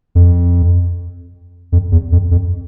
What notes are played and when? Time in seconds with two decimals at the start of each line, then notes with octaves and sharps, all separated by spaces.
0.15 F2
1.72 F2
1.92 E2
2.12 F2
2.31 F2